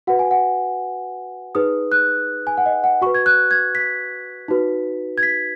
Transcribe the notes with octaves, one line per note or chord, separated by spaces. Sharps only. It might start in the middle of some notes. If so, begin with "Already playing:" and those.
F#4 B4 F#5
G#5
F#5
D#4 G#4 B4 D#6
F#6
G#5
F#5
D#5
F#5
F#4 B4 C#6
G#6
F#6
G#6
B6
D#4 F#4 B4
G#6
B6